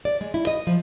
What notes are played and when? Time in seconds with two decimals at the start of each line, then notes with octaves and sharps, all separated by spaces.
0.05 D5
0.21 G#3
0.34 E4
0.47 D#5
0.67 F3